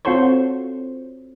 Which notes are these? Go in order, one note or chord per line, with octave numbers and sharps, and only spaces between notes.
C4 F4 F#4 A4 C5 C#5